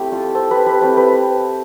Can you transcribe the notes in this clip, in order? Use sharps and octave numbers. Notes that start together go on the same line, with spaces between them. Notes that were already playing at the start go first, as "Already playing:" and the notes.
Already playing: A3 C4 E4 G4
F4 A4
A4 C5
G4 B4
G4 B4
A3 C4 E4 A4 C5
G4 B4